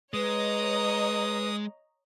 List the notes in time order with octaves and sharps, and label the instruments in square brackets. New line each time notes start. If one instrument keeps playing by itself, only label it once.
[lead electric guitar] G#3 [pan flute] B4 [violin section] C#5 D#5 A#5 [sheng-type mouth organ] D#6